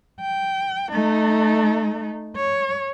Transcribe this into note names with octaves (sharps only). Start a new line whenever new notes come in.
G5
A3 D#4
C#5